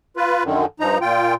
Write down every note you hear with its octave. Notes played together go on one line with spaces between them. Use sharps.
F4 B4
F#2 D3 D#3
G2 F3 D#4 A#5
A#2 F4 G5